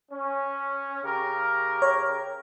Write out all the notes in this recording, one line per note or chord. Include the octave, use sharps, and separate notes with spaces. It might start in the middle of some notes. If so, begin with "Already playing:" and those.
C#4
C#3 G4 A#4
C#5